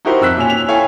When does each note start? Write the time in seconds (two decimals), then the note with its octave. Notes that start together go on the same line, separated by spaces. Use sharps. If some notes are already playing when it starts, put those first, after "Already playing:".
0.05 D#4 E4 F#4 G4 A#4 C5
0.21 F2 E6 F#6 B6
0.36 A#2 C#4 G#5 F7
0.50 F7
0.68 E4 A4 C#5 F5 G5 G#5